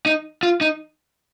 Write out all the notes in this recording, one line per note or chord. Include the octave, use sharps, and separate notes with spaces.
D#4
F4
D#4